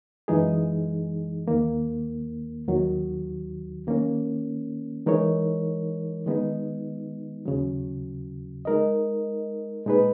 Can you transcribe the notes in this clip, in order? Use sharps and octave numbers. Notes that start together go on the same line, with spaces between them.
F#2 E3 G#3 D#4 G#4
D#2 D#3 A#3
D#2 D#3 F#3
D#3 A#3 C#4
E3 G#3 D#4 A#4 C#5
D#3 G#3 B3 D#4
D#2 C#3 F#3
G#3 D#4 A#4 D#5
A#2 G#3 D#4 G#4 B4